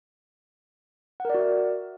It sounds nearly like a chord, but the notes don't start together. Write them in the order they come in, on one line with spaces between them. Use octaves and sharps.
F#5 A#4 D5 F#4 E5